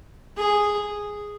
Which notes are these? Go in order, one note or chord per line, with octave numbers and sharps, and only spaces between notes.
G#4